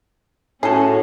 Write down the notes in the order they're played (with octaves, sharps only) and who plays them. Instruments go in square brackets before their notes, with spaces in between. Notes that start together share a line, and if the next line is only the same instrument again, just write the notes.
[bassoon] A2 [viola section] C#4 F#4 [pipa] G#4 A4